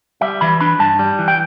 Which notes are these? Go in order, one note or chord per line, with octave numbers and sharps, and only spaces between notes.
G3 E5
E3 B5
D4 B5
G2 A5
G3
E3
G5